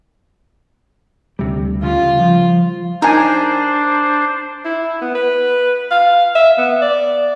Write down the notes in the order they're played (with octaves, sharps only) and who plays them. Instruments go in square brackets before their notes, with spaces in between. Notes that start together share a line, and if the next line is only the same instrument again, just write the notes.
[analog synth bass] D2 [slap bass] C3 G3
[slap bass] C#3 G3 [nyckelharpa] F4
[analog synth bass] F3
[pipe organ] D4 C5 [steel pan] D#4 G#5 [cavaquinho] A#4
[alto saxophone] E4
B3
B4
F5
E5
B3
D5